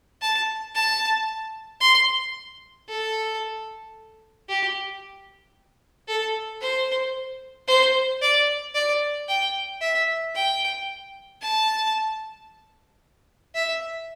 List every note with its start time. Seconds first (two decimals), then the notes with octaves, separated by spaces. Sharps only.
0.21 A5
0.75 A5
1.81 C6
2.89 A4
4.49 G4
6.08 A4
6.61 C5
7.68 C5
8.22 D5
8.75 D5
9.28 G5
9.81 E5
10.35 G5
11.42 A5
13.55 E5